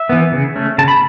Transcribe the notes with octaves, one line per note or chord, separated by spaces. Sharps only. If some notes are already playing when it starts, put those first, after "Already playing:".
Already playing: E5
E3 B3
C#3
A3 C#4
C#3 A5
B5